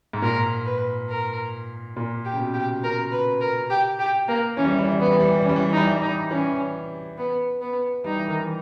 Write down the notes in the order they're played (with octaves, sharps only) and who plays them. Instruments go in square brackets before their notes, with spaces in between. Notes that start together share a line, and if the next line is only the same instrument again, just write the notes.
[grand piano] G#2
[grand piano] A#2 [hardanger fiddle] A#4
[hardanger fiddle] B4
A#4
[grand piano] A#2
[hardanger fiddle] G4
[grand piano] C#3
B2
[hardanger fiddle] G4
[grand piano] C#3 [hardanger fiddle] A#4
[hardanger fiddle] B4
A#4
G4
G4
A#3
[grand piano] E3 [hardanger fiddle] C#4
[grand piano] G3
E3
G3
E3
G3
[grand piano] E3 [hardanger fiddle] B3
[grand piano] G3
E3
G3
E3
G3
[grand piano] E3 [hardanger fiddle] C#4
[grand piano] G3
E3
G3
[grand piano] E3 [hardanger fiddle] D#4
[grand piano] G3
E3
G3
[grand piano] E3 [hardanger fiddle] D#4
[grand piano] E3 [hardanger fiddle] C#4
[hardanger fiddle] B3
B3
[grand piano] G3 [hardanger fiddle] D#4
[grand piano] E3
D#3
E3